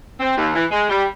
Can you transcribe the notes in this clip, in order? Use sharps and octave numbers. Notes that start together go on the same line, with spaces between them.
C4
D#2
E3
G#3
G3